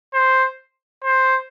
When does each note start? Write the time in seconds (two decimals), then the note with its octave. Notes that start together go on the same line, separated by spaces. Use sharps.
0.14 C5
1.04 C5